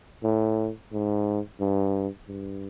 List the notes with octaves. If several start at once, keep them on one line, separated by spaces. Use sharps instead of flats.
A2
G#2
G2
G2